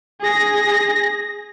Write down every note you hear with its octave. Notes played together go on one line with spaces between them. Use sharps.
G#4 A#6